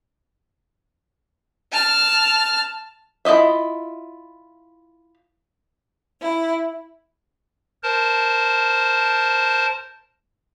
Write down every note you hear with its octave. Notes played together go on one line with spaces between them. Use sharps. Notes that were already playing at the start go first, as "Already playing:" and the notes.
A5 F6
E4 F4 D#5 E5
E4
A#4 C5 A5